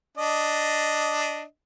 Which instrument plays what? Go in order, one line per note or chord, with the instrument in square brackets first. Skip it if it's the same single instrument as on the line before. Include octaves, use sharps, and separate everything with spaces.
[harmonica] D4 D#5